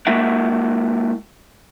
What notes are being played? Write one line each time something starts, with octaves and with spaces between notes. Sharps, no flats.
G#3 A#3 E4 F#4 E5 F#5